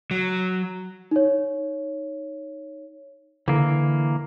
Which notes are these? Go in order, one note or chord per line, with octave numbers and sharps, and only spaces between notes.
F#3
D#4 C#5
D3 E3 A#3